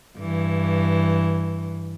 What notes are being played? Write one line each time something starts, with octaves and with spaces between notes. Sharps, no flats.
G2 E3